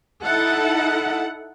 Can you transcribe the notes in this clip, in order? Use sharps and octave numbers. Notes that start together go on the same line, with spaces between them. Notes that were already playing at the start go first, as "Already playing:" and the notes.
D#4 E4 A4 F#5